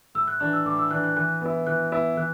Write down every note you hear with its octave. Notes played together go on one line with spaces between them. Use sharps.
A2 E6
F#6
E3 D4 F#6
E6
A2 D6
E6
E3 D4 F#6
F#6
E3 F#6
B3 E4
E3 F#6
B3 E4
E3 F#6